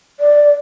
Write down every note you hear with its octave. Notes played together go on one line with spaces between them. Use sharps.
D5